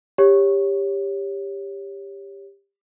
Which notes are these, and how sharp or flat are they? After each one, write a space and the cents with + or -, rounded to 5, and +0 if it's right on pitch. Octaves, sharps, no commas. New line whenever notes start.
G4 +20 C#5 +0